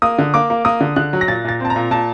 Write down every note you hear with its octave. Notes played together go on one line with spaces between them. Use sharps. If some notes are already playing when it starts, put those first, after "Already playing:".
A#3 D#6
D3
A#3 D6
A#3
A#3 D#6
D3
D3 F#6
F#3
A#6
A#2 A6
A#2 A6
C4 A5
A#5
A#2
A#2 A5